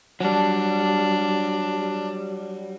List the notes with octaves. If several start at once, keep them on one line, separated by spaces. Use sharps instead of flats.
F#3 G3 D4